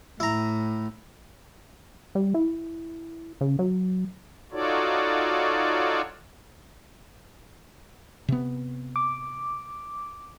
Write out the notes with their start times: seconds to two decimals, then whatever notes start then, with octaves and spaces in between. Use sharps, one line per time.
0.20 A2 E4 A#5
2.15 G3
2.34 E4
3.41 C#3
3.59 F#3
4.52 D#4 F4 F#4 A4 C#5 D5
8.28 C3 B3
8.96 D6